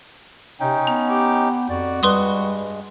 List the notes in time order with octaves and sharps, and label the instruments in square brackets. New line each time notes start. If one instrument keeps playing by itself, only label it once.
[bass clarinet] C3 [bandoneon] C#4 D#4 [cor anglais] G5
[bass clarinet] B3 [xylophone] A#5
[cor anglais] G4
[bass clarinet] F2 [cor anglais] F#4 [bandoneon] D5
[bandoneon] G2 G#3 [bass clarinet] G3 [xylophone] B4 C6 D#6